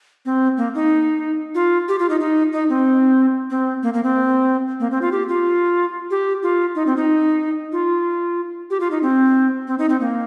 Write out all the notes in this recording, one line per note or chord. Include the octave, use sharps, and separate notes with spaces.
C4
A#3
D#4
F4
G4
F4
D#4
D#4
D#4
C4
C4
A#3
A#3
C4
A#3
C4
F4
G4
F4
G4
F4
D#4
C4
D#4
F4
G4
F4
D#4
C4
C4
D#4
C4
A#3